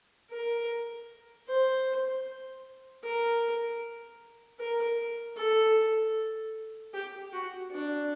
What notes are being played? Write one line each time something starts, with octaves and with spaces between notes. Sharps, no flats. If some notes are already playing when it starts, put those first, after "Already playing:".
A#4
C5
A#4
A#4
A4
G4
F#4
D4